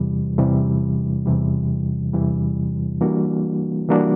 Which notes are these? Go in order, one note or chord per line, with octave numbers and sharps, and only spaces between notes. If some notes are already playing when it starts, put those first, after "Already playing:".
Already playing: E2 C3 E3 G3
E2 C3 E3 G3
E2 C3 E3 G3
E2 C3 E3 G3
E3 G3 A#3 D4 F#4
E3 G3 A#3 D4 F#4